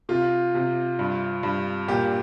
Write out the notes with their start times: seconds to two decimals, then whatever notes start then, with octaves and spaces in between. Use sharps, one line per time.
0.09 C3 F4
0.54 C3
0.99 G2
1.43 G2
1.88 A#2 G4